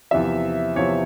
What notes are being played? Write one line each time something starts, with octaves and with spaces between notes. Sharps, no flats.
E2 C3 F3 E5
E2 C3 F3 C#5